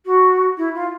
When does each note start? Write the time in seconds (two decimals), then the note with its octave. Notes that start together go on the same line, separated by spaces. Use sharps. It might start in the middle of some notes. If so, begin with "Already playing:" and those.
0.05 F#4
0.57 E4
0.74 F4